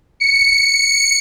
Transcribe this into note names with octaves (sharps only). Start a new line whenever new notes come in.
C#7